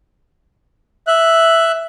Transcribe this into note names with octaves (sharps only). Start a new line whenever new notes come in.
E5 F#6